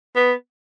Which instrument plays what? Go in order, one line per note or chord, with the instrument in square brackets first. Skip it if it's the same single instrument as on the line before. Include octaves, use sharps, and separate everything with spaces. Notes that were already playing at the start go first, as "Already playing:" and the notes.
[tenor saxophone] B3